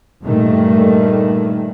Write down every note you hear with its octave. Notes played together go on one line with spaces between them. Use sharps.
G2 A#2 D#3 A3